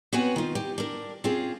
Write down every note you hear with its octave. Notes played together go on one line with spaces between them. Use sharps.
B3 C4 F#4 B4 C#5 G#5
D#3 F4
G4
D4 A#4
C4 C#4 F4 G#4